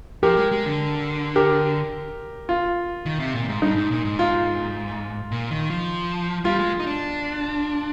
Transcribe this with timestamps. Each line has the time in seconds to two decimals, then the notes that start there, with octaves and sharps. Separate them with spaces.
0.23 F3 G4 A#4
0.37 G#3
0.51 G#3
0.66 D3
1.36 G4 A#4
2.49 F4
3.06 D#3
3.20 C3
3.34 A#2
3.48 G#2
3.62 G2 D#4
3.76 G#2
3.91 A#2
4.05 G#2
4.19 F4
5.31 A#2
5.51 D#3
5.70 F3
6.44 G3 F4
6.59 G#3
6.80 D#4
6.87 D4